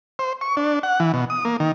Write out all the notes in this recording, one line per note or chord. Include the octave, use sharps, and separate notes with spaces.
C5
C#6
D4
F#5
E3
B2
D#6
A#3
D#3